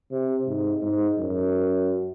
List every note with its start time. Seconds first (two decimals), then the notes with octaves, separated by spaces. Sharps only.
0.11 C3
0.47 G#2
0.82 G#2
1.18 F#2